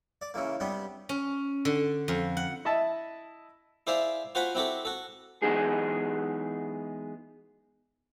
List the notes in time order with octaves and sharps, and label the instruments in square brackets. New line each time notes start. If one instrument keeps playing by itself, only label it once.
[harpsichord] D5
C#3 E3 A#3
C3 G3 B3 D4
[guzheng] C#4
D3
F2
F#5
[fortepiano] E4 D#5 E5 A5
[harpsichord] E4 G#4 C5 D5 E5 F5
F4 F#4 C5 F#5 G#5 B5
C4 E4 F#4 G4 A4
F#4 A4
[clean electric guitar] E3 F#3 G#3 B3 D#4 G#4